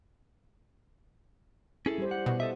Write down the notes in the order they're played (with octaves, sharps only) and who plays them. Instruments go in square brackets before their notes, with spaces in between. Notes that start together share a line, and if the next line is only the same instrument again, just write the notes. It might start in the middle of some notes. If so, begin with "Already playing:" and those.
[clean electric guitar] C#4 G#4 A4 [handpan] E4
[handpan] G3 G4 C5
[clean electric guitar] F#5
[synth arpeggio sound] B2 [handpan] B3
[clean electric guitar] A4 D#5 E5